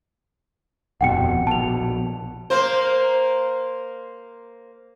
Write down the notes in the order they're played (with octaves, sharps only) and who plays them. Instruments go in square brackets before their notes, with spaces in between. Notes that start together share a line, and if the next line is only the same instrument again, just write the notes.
[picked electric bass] D#1 F2 B2 [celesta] F#5 G5 C#7
[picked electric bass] A#1 B2 [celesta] A5 F7
[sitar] A#3 C5